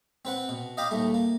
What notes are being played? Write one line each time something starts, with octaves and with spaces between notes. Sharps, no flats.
C4 B4 F#5
B2
D#5 F5 G5 A#5 B5 D6
D#2 G3 A3
A#3